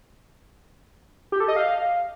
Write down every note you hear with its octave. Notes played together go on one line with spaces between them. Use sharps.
G4
A4
D#5
F5